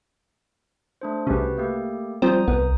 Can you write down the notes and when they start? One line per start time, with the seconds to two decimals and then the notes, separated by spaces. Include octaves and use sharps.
1.01 A3 D4 C5
1.27 C2 C#3 F#4 G4 B4
1.58 A3 A#3 G4
2.22 F3 G3 C4 A#5 D#6 G6
2.48 C2 B3